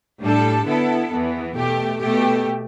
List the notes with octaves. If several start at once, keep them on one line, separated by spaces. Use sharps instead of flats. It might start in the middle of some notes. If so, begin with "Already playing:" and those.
A2 G3 D4 A4
D3 B3 E4 A4
E2 E3 B3
B2 A3 G4
B2 A3 G4